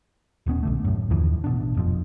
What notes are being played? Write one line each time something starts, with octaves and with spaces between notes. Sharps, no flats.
D#1 G2 B3 C#4
B1 D3 A3
F#2 A2
D#2 D3 E3 F3
A1 B2 D4
F1 F2 F3